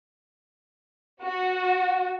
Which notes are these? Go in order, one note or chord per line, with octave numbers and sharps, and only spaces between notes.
F#4